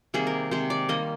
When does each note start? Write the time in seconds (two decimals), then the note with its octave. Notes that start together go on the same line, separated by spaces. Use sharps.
0.14 C3 D#3 G3 A#3 G#4
0.27 A#4
0.51 C3 D#3 G#3 C5
0.70 D5
0.89 D#3 G3 A#3 D#5